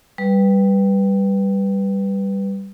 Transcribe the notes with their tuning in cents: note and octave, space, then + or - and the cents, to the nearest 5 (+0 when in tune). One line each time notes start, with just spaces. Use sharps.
G3 +0 B4 +0